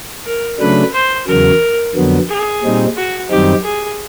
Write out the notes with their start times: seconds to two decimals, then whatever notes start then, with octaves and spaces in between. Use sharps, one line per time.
0.25 A#4
0.59 C#3 F#3 A3 D4 B4
0.93 C5
1.27 E2 C#3 F#3 A#4
1.95 F2 D3 F#3 B3
2.29 G#4
2.63 A#2 G3 C4 D#4
2.96 F#4
3.30 F#2 D#3 G3 C4 D#4 G4
3.64 G#4